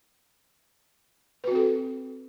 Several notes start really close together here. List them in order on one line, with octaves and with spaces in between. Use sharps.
B4 F#4 C4 A4